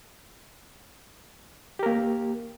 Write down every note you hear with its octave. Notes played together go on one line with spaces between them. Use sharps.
A#3 G4 A#4